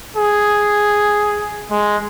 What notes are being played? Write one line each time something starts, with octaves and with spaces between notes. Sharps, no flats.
G#4
G#3